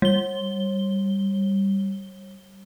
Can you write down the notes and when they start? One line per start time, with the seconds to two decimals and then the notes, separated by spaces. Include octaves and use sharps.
0.02 G3 G7